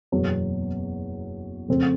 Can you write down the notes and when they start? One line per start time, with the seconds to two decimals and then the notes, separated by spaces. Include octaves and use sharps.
0.12 F#1 E2 B2 F#3
1.68 F2 C#3 F3 A3 C4